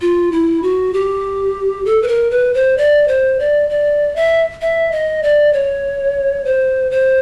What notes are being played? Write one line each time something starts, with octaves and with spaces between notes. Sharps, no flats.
F4
E4
F#4
G4
A4
B4
A#4
B4
C5
D5
C5
D5
D5
E5
E5
D#5
D5
C#5
C5
C5